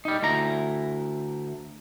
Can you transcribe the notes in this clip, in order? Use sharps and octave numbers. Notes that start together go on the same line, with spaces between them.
G3 D#4
D2 E4 A#5